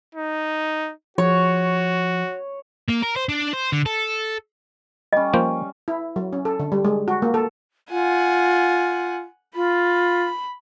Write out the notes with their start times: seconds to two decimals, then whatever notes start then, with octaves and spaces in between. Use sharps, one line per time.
0.15 D#4
1.18 F3 F#4 C#5
2.89 A#3
3.03 A#4
3.16 C5
3.29 D4
3.53 C5
3.72 D3
3.86 A4
5.13 G3 C#4 D#5
5.34 F3 A#3 C5
5.88 E4
6.16 F#3
6.33 C#4
6.45 A4
6.59 D3
6.72 G3
6.85 G#3
7.08 F#4
7.22 A#3
7.34 A4
7.90 F4 F#5 G#5
9.56 F4 B5